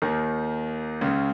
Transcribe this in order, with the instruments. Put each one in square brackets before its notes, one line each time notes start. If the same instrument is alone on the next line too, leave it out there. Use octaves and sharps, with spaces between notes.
[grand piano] D#2 D#3
C#2 C#3